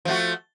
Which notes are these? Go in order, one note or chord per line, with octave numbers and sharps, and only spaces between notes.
F3 A3 F#4